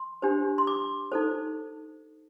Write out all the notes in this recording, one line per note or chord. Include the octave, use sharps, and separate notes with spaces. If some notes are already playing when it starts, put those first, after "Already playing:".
Already playing: C6
D4 G4 C5
C6
D6
D#4 A4 C5